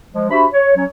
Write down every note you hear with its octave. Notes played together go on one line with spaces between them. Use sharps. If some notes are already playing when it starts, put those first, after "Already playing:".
F3 G#3
D4 F#4 G4 C5 E5 B5
C#5
F#3 C#4 C#5